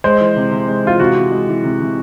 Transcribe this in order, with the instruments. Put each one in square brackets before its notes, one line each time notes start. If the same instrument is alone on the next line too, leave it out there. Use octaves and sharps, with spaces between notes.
[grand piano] G#3 [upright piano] C5
[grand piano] E3
C3
C3
G#3
[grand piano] E3 [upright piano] F4
[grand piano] C3 [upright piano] F#4
[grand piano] C3
G#3
E3
C3
C3